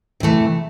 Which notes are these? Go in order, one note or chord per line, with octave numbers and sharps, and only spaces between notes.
C3 E3 A3